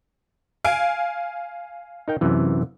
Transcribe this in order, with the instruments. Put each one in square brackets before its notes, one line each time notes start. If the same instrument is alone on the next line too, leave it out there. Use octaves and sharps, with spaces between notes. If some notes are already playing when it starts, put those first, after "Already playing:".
[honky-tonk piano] F5 G#5 D7
[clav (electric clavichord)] D#4 A#4 G5
F#2 C3 E3